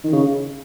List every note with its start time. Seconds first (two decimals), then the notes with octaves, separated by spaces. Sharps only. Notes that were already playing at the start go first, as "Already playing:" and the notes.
0.04 D#3
0.12 C#3